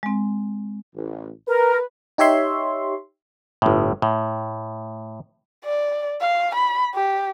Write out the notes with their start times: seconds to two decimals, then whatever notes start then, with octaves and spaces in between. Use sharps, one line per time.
0.03 G#3 C4
0.95 A1
1.48 A#4 B4
2.18 D#4 G4 C#5 E5 C6
3.62 G1 A2
4.02 A2
5.65 D5
6.21 F5
6.55 B5
6.94 G4